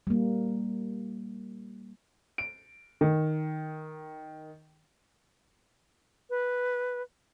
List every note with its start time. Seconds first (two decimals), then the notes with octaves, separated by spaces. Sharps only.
0.07 G3 A#3
2.38 D7
3.01 D#3
6.30 B4